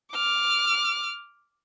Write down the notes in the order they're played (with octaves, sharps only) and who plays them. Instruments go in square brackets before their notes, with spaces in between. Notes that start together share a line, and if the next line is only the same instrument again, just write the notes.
[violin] D6 F6